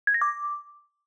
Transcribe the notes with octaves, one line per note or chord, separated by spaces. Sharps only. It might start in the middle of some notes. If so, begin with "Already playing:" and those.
G#6
A#6
D6